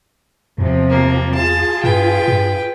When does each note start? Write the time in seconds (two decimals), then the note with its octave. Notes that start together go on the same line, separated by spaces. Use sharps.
0.58 E2 C3 F3
0.90 A#3
1.34 F4 G#4 A5
1.84 G2 B4 G5
2.28 G2